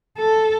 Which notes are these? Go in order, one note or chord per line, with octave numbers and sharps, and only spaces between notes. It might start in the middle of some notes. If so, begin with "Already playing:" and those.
A4